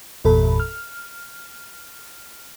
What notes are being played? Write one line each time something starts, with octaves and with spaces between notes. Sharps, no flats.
G1 E2 A#2 A4 B5
F6